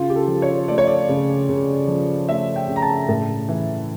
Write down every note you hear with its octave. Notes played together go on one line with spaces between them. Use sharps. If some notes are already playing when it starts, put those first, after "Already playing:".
Already playing: C#3 F4
G4
A4
F3
C#5
A3 D5
C#5
D5
C#3
C#3
F3
A3 E5
G5
C#3
A#5
A5
A2
E3